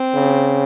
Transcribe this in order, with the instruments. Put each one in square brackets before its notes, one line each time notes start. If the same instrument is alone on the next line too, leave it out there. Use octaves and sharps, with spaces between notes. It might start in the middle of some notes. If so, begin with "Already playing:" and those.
Already playing: [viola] C4
[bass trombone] C#3